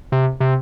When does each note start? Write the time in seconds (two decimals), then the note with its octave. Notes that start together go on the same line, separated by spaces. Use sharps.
0.12 C3
0.40 C3